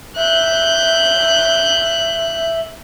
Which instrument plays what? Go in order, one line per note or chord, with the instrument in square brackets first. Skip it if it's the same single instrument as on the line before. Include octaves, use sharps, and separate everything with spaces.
[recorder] E5 [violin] F#6 G6